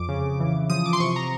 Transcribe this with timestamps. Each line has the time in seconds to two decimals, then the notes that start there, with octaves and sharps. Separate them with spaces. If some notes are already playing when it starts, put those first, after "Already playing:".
Already playing: F2 D6
0.09 C#3
0.40 E3
0.70 F3 D#6
0.86 D6
0.93 C6
1.00 C3 C#6
1.16 A#5